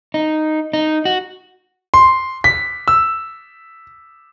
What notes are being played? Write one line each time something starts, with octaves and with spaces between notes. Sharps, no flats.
D#4
D#4
F#4
C6
B6
E6